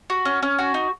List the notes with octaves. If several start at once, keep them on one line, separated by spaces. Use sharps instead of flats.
F#4
C#4
C#4
F#4
D#4